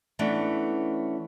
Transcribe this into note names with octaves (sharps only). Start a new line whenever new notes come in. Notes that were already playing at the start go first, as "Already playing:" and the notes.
E3 A3 B3 C#4 D4